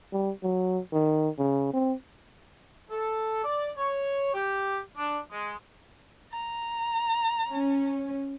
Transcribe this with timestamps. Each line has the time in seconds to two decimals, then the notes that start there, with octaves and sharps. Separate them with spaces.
0.12 G3
0.43 F#3
0.92 D#3
1.38 C#3
1.74 C4
2.90 A4
3.44 D5
3.78 C#5
4.34 G4
4.97 D4
5.32 G#3
6.32 A#5
7.51 C#4